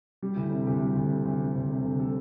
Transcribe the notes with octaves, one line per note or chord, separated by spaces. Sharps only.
G3 G4
D2 E4
C3 A4
D2 G4
G3 G4
D2
C3
D2
G3
D2
C3
D2
G3 A4